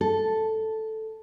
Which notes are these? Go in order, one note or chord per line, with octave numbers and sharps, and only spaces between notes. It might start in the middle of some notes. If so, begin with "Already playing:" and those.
A4